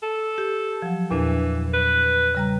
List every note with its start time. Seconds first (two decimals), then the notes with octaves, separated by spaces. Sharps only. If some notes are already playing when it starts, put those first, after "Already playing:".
0.02 A4
0.38 G4
0.82 F3 F#3
1.11 E2 A#2 E3 D4
1.74 B4
2.35 C#3 G3 A#5